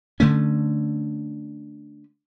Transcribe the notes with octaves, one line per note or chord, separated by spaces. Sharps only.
D3 A3 C#4